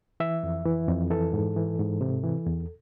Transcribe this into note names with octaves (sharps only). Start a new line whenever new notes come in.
E3 E5
F2
E3
F2
E3 A4
G#2
E3
G#2
C3
E3
E2